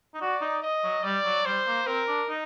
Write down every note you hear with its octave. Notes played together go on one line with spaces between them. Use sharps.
D#4
F#4 D5
D#4
D#5
F#3
G3 D5
F#3
G3 C5
A#3
C4 A#4
D4
D#4